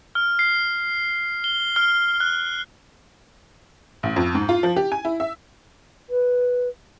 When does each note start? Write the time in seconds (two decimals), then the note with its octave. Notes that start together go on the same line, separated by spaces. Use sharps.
0.15 F6
0.39 C7
1.44 G7
1.76 F6
2.20 F#6
4.03 A1
4.16 F2
4.35 G#2
4.49 F4
4.63 F3
4.76 G4
4.92 G#5
5.05 E4
5.20 E5
6.09 B4